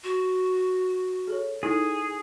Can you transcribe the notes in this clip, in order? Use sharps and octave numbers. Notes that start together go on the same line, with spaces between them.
F#4
G#4 A4 C#5
D#4 E4 G#4 A4